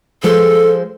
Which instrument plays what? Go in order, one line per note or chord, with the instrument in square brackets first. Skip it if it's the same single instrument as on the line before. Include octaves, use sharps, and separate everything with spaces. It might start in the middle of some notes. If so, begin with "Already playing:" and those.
[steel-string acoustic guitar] F3 G#3 C5 [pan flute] A4